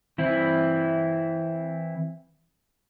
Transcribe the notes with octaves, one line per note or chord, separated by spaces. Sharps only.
E3 C4 E4